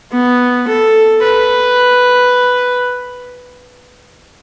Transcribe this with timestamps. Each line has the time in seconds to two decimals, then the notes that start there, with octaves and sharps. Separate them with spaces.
0.13 B3
0.68 A4
1.24 B4